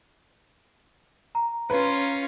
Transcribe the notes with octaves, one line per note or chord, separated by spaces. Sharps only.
A#5
C#4 F4 B4